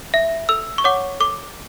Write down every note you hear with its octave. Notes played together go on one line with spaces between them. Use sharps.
E5
A4 E6
C#6
C#5 F#5 D6
A4 D6